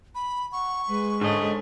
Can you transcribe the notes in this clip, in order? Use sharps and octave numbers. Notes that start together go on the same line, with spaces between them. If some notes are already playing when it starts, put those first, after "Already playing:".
B5
F#5 C#6
G#3 B4
G#2 D3 A3 C#4 D#5